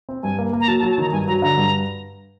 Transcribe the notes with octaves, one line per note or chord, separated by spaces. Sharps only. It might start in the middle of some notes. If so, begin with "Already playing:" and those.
C4
G2 G#5
A#3
A#3
A#5
F#3 A5
A5
F#3
A5
D#3 A#5
G2 G#5
F#3 A#5
D3 A#5
G2